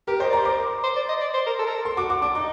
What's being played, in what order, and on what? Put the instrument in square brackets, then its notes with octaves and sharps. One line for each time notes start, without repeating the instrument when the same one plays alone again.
[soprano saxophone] G4 [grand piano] A#4
[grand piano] C5 [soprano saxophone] D#5
[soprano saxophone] D5
[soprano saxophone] C5 [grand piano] A#5
[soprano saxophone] A#4 [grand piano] D6
[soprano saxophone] C5
D5
D#5
D5
C5
A#4
A4
A#4
A4
[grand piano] C6
[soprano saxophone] F#4 [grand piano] D6
[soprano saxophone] F#4 [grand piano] D6
[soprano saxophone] D4 [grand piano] D6
[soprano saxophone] D#4 [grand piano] D6